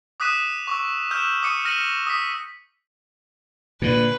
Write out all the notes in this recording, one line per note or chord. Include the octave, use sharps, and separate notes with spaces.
D6 D#6 F#6 B6 D#7 E7
C#6 D6 E6
E6 F6 G6 E7
D6 D#6 C#7 D#7
F6 A#6 C#7 D#7 F#7
D#6 B6
A#2 D3 B4